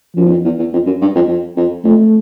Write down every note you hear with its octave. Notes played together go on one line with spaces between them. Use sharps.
F#2 F3
E2
F2
E2
E2
F2
F#2
G2
F2
F2
F2
F2 A3